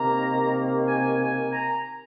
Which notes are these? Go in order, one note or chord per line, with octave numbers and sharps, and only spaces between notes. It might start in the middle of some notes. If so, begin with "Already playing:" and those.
Already playing: C3 D#3 A#3 A#5
G#5
G#5
A#5